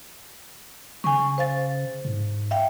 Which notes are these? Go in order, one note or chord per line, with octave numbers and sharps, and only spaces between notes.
C#3 G#5 C#6
C5 F5 A6
G#2
E5 F5 G5